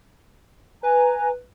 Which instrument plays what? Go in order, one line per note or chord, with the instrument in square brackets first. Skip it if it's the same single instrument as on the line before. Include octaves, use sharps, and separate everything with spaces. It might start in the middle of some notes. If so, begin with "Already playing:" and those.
[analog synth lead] B4 [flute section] G#5 A#5